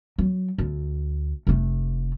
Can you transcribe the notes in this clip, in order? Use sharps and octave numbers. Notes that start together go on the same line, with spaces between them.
F#3
D2
F1 A3